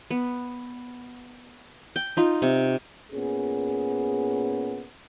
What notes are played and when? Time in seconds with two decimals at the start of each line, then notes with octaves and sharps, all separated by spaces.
0.11 B3
1.96 G5
2.17 D#4 F4
2.42 C3
3.12 A#2 B3 C#4 G#4